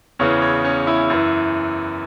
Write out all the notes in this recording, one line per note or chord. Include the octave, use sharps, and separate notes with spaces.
E2 C#3 E3 C#5
C#5
C#4
E4
F#2 E3